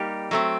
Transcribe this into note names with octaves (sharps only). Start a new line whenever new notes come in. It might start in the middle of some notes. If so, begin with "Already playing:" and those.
Already playing: G3 A#3 D#4 G4
F#3 A3 C4